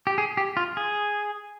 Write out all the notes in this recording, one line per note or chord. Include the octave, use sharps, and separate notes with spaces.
G4
G#4
G4
F4
G#4